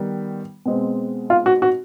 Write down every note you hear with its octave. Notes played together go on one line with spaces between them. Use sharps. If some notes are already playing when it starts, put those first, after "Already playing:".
Already playing: D#3 G3 B3
B2 G#3 C4
F4
F#4
F#4